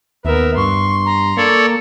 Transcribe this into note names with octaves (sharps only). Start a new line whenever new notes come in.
D#2 B3 A#4 E5
G2 C6 C#6
A#5
A#3 A4 C#5 D5